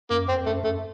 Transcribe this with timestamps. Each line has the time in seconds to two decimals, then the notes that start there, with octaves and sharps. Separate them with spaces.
0.11 F#2 A#3
0.29 F2 C4
0.46 F#2 A3
0.63 F#2 A3